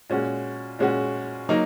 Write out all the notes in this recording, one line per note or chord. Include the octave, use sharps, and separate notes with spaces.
A#2 G#3 C#4 F#4
A#2 G#3 C#4 F#4
F#3 A#3 D#4